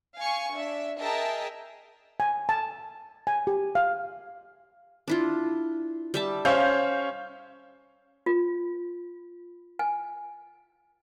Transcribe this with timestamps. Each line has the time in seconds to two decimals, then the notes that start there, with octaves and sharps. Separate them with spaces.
0.16 F5 G#5 C#6
0.52 D4 E5
0.99 G#4 A#4 D#5 E5 G5 A5
2.20 G#5
2.49 A5
3.27 G#5
3.47 G4
3.75 F5
5.08 D4 E4 F4
6.14 G3 E5 A5
6.45 C#4 C5 C#5 E5 F5 G6
8.26 F4
9.79 G#5